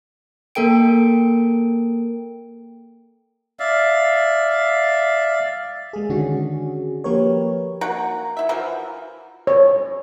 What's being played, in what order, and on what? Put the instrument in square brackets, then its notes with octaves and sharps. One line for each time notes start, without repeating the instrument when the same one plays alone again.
[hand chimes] A#3 A4 A#4 G5 D7
[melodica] D5 E5 F5
[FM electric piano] G#3 G#4
D3 D#3 C#4 D4 F#4 G#4
F3 A#3 G4 A#4 B4 C#5
[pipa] A#3 F#4 F#5 A#5
E4 E5
E3 F3 F#4 A#4
[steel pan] C#5